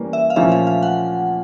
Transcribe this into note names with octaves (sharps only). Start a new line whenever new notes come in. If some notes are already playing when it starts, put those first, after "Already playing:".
Already playing: E3 G3 A#3 C#4
E5
F5
A#2 F3 A#3 C#4 F4 E5
F5
F5
F#5